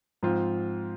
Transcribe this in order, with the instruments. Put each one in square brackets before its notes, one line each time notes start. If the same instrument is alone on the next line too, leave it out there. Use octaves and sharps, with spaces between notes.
[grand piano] G#2 F3 C4 F4